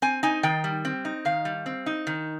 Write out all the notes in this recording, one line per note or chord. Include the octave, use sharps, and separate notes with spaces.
C4 G#5
D#4 G#5
D#3 G5
G3
C4
D#4
D#3 F5
G3
C4
D#4
D#3